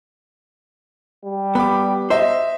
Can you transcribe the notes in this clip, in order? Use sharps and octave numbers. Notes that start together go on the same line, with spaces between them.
G3
B3 B5 D6
C5 D#5 E5